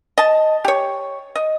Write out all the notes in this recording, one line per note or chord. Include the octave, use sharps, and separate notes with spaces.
D#5 A5
G4 C#5
D#5